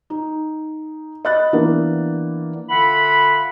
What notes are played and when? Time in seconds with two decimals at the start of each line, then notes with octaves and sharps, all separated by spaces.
0.10 D#4
1.25 D#5 B5 F#6 A6
1.53 E3 A#3 B3 D4
2.69 D3 F4 E5 F#5 B5